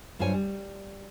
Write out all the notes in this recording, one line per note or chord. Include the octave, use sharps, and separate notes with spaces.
G2 F#3 F4 C5 C#5 G#5
G3